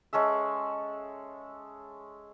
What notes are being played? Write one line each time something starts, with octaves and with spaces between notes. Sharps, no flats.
G#3 C#4 A4 E5